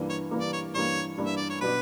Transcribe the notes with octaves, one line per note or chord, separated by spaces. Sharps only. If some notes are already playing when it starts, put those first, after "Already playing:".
Already playing: G2 E3 A#3
C#5
G2 E3 A#3
D5
C#5
G2 E3 A#3 C#5
G2 E3 A#3
E5
D5
C#5
B2 F#3 B3 D4 B4